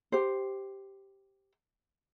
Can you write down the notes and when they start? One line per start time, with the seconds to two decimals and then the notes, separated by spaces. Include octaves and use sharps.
0.12 G4 C5